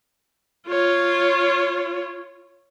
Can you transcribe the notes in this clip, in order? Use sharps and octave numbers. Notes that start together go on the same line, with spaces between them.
F4 C#5